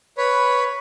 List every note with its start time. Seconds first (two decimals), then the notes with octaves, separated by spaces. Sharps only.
0.18 B4 C#5 B5